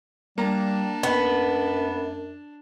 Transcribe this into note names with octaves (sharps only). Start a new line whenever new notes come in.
G3 A#3 D4 A#5
F#2 B3